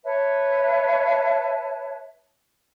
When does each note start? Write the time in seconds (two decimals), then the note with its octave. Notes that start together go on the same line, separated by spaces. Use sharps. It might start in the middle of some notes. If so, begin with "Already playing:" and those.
0.04 B4 C#5 E5 A5